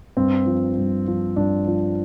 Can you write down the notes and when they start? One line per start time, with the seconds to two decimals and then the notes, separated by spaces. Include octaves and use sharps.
0.17 G2 C4
0.46 F3
0.78 G2
1.08 F3
1.36 G2 D4
1.67 F3